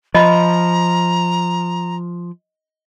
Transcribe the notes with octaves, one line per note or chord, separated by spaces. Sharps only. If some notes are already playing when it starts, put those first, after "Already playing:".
F3 D#5 A#5 B5